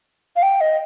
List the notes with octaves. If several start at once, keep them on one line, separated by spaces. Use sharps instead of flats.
F5
G5
D#5